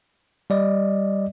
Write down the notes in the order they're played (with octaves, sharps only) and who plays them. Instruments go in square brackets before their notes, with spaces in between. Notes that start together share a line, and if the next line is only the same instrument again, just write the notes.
[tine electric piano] G3 D5 D#5